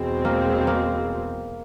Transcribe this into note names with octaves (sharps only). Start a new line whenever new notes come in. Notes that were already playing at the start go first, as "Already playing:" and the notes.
Already playing: E2 B2 G#3 C4
A#3
A#3